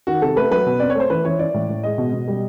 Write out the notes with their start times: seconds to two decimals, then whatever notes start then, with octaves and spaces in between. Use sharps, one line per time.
0.07 D#3 F#4
0.22 C3 A4
0.36 A3 B4
0.51 F#3 B4
0.66 B2
0.80 C4 D5
0.90 C#5
0.95 A3 C5
1.10 E3 B4
1.25 E3 C#5
1.39 E3 D5
1.54 A2
1.69 A2
1.83 G#3 D#5
1.98 B2
2.13 B2
2.28 G3